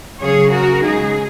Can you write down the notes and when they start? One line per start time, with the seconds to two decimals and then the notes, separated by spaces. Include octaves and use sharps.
0.21 C#3 F#3 C#4 G#4 C#5
0.52 F#4 A#4
0.83 C#3 G#3 D#4 G#4